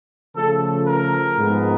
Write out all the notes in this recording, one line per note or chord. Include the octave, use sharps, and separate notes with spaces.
C#3 F3 A3 A4
A#4
G#2 F3 G#3 B3